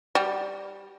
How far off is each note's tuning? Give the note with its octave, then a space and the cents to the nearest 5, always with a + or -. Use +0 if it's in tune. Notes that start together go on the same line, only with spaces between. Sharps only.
G3 +0 F#4 +45